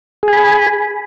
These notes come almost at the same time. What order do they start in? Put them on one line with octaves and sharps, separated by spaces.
G#4 G#5 B5